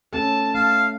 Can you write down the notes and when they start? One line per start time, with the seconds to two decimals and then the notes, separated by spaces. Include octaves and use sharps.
0.13 A3 C#4 A4 A5
0.55 A3 F5